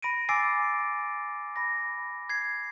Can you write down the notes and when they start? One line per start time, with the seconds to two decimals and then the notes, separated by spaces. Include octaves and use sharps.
0.02 B5 A#6 D7 D#7
0.29 G#5 D6 E6 A6 C7 D7
1.56 B5 A#6
2.29 G#6 C7